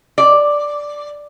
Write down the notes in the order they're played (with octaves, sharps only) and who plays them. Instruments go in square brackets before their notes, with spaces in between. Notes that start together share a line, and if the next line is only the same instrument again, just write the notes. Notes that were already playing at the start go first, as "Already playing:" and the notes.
[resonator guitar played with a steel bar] D5